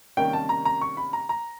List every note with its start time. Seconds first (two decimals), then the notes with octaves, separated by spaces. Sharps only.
0.17 C3 D#3 G3 A#3 C#4 G5
0.33 A5
0.49 A#5
0.65 A#5
0.81 C#6
0.97 B5
1.13 A#5
1.29 A#5